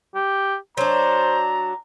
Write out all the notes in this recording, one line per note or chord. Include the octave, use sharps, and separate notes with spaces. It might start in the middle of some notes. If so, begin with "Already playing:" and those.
G4
F#3 D4 C5 A#5